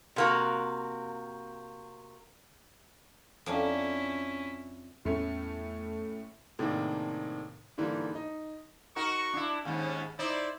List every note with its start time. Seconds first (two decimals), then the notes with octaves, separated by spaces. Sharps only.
0.16 C3 A#3 F#4
3.46 F2 C#4 D4 E4 A#4
5.05 E2 A2 A3 B3 C#4
6.59 A2 C3 D#3 A#3 D4 G#4
7.78 G#2 D3 E3 G3 A#3
8.15 D#4
8.96 D#4 F#4 A#4 C#6
9.33 D4 E4
9.65 D#2 G#2 C#4
10.19 D#4 E4 C5 D5